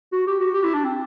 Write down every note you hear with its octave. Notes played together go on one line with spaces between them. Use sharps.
F#4
G4
F#4
G4
E4
D4
C4